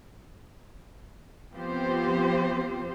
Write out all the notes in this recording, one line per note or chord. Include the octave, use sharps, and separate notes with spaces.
F3 B3 C4 F4 G4 C5